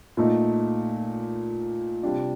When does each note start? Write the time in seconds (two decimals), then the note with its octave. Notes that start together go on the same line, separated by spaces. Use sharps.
0.17 A#2 A3 D#4
2.03 C3 G3 D4 F4